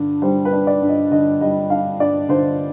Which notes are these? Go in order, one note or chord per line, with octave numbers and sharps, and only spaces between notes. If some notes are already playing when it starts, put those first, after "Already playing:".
Already playing: G2 D3 D4
G3 C5
B4
D4
D5
G2
D#5
D3 D#5
G3 D#5
D4 F5
G2 D5
D3 C5